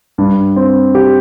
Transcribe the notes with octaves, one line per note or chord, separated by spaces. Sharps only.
G2
C4
G4